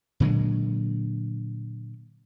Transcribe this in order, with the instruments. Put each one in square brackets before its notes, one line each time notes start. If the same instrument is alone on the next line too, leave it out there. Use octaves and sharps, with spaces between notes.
[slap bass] A#2 D3 F#3 G#3